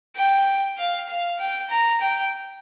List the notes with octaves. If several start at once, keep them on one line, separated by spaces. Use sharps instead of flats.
G5
F5
F5
G5
A#5
G5